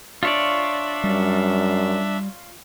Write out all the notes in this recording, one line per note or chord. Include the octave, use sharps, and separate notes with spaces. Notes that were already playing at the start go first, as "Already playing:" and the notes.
D4 F4 C#5 D5 E5
F#2 G3